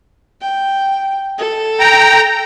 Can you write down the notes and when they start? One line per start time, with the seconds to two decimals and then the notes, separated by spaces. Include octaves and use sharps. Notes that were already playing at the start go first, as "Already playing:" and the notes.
0.41 G5
1.39 A4
1.80 G5 A#5